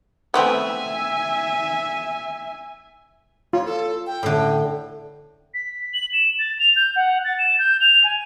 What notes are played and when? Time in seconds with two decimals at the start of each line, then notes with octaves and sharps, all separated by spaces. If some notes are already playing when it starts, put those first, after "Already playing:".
0.34 A3 B3 C4 E5 G#5
3.53 F4 C#5
3.66 A4
4.07 G5
4.23 A2 D3
5.54 B6
5.94 F#7
6.13 E7
6.39 A6
6.59 F7
6.76 G6
6.96 F#5
7.25 A6
7.39 E7
7.59 G6
7.81 F7
8.04 G#5